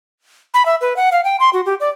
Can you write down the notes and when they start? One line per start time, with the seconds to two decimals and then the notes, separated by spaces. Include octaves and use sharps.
0.54 B5
0.66 E5
0.81 B4
0.96 F#5
1.12 F5
1.24 G5
1.40 C6
1.53 F#4
1.66 G4
1.80 D5